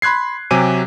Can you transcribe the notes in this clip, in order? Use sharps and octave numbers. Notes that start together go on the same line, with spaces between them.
B5 C6 F#6 G#6 C7
C3 F#3 G4 G#5 D6 D#7